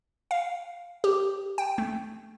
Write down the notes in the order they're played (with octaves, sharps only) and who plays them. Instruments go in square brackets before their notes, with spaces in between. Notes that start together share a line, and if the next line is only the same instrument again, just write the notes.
[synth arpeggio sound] F5
G4
G5
A3